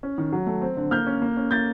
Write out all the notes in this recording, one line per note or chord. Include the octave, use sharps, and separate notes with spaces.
C#4
D#3
F#3
A3
C4
D3
A#3 F6 G6
C#4
A#3
C#4
A#3 G6 A6